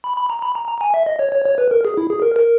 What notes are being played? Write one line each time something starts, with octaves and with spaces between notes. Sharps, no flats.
B5
B5
A#5
B5
A#5
A#5
G#5
E5
D#5
C#5
C#5
C#5
B4
A#4
G#4
E4
G#4
A#4
A#4